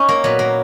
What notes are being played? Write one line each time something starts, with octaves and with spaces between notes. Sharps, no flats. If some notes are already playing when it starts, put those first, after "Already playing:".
Already playing: C#4 D#4
A#3
A#2 F#3 B3
A#3